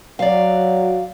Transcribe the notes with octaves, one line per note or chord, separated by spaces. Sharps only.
F#3 D5 F5